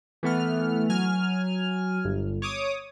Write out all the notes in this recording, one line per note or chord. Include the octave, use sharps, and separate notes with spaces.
E3 A3 B3 F6
F#3 G#5 F6
G1
C#5 D6 D#6